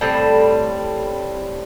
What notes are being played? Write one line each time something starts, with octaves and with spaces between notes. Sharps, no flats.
A2 G3 C4